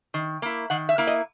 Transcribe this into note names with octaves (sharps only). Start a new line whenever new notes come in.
D#3
A#3 E4
D#3 F#5
E5
A#3 E4
D#5